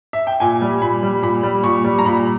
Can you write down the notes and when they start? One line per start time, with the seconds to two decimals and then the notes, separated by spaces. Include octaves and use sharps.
0.13 E5
0.27 G5
0.40 A#2 G#5
0.61 G3
0.82 A#2 B5
1.03 G3
1.22 A#2 B5
1.43 G3
1.64 A#2 C#6
1.84 G3
1.99 A#5
2.05 A#2 B5